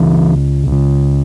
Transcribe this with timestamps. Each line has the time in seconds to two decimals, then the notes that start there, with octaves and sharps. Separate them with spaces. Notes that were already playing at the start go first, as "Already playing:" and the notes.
Already playing: C#2 C#3 E3
0.67 C#2 C#3